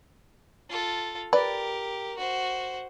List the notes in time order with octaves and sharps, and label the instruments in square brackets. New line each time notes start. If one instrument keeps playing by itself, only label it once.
[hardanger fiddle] F4 A4
[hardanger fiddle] G4 A#4 [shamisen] B4 [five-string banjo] D5
[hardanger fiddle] F#4 C5